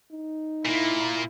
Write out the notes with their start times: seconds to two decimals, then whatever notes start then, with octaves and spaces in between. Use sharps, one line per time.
0.12 D#4
0.66 A#2 A#3 E4